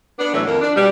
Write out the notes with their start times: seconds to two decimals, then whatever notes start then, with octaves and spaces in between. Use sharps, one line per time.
0.19 B3 D4
0.34 A2 E3 F#3 A3 D4
0.46 F2 D#3 A#3
0.61 D4
0.76 B2 G3